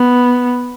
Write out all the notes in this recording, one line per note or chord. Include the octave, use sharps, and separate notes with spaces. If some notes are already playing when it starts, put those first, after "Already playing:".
Already playing: B3